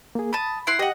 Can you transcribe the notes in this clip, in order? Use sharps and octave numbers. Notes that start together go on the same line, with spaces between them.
A#3 G#4
A5 B5 D#6
E4 F#5 C6
G4 D#5 F#5 G5